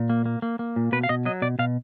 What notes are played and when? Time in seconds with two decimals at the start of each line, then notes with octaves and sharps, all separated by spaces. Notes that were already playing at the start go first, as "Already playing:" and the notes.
Already playing: A#2
0.10 A#3
0.26 A#3
0.42 A#3
0.59 A#3
0.76 A#2
0.92 B2 B4
1.03 F5
1.09 B2 D#5
1.25 F#3 D#5
1.42 B2 D5
1.59 B2 F5